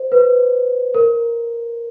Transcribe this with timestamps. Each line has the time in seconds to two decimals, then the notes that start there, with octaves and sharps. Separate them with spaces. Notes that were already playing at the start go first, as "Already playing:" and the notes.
Already playing: C5
0.12 B4
0.94 A#4